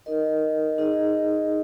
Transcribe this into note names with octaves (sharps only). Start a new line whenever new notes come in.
D#4 A#4 D#5
D#4 G#4 D#5